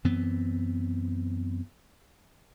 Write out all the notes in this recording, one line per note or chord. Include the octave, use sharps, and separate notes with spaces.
F#2 E3 B3 C4